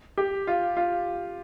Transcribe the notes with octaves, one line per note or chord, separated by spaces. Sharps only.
G4
F4
F4